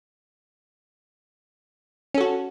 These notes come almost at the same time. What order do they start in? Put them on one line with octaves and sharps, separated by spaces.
C#4 A4 F#4